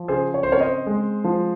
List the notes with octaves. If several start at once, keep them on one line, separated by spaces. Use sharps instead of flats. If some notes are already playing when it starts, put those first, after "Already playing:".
Already playing: F3
C#3 G#4 C5
C#5
C5
C4 A#4 C#5
C5 D#5
G#3
F3